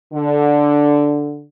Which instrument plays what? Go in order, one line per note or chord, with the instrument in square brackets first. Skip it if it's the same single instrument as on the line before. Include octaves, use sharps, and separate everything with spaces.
[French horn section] D3